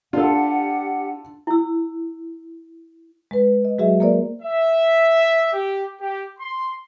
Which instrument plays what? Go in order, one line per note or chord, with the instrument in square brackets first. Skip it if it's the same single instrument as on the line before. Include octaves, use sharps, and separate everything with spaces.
[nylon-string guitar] D4 [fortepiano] F4 A4 [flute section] G4 F#5
[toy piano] E4 E6
[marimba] G#3 B4
D#5
F#3 G#3 F#4 G#4 D#5 E5
A#3 A#4 C5 D5
[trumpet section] E5
G4
G4
C6